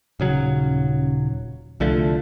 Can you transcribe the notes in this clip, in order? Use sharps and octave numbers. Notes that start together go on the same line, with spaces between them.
D#1 C#3 F#3
C2 D3 F3 A3